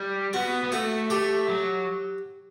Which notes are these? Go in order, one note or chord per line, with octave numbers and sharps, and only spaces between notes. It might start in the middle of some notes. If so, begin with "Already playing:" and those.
Already playing: G3
B3 F#4
B3
A3 F#4
A3 G4
F#3